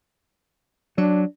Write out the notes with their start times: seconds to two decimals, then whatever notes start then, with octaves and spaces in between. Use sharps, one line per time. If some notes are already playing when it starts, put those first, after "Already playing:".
0.98 F#3 D4